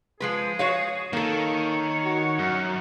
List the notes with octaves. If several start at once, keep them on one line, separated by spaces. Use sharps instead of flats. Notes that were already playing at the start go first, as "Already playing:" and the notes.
F3 G#3 G#4 B4
F#4 C#5 F5
D#3 A#3 A4 C#5
F#4
F#2